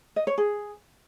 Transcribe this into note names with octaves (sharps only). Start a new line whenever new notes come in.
D#5
C#5
G#4